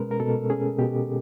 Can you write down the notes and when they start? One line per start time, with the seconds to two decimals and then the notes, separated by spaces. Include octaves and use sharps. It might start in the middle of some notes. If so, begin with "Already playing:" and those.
Already playing: B2 G#3 C#4 A#4 B4
0.11 A#4
0.20 B2 A4
0.50 C#4 G#4
0.79 B2 G4